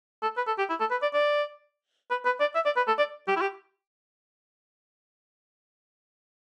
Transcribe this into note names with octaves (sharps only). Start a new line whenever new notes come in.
A4
B4
A4
G4
E4
A4
B4
D5
D5
B4
B4
D5
E5
D5
B4
A4
D5
G4
E4
G4